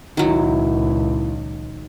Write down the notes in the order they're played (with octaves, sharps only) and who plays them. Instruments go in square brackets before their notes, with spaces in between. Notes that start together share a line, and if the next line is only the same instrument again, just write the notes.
[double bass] C#2 A#2 [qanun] D#3 F#3 [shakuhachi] E4